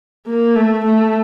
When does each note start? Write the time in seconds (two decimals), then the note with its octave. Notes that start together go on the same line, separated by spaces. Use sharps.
0.27 A#3
0.56 A3
0.84 A3